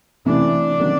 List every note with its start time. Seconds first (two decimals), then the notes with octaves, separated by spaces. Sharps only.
0.26 C3 E3 A3 D4
0.80 C3 D#3 F#3